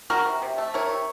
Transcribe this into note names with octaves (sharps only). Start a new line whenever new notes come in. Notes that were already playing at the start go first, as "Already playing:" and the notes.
D#3 F#4 A#4
C3
C3
A3
D#3 A#4 C#5
C3